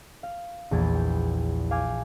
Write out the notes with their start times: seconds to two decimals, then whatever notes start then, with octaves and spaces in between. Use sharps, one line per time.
0.23 F5
0.71 A#1 E2 G#6 A6
0.95 G5
1.71 F5 G#5 D6 F6 G6 G#6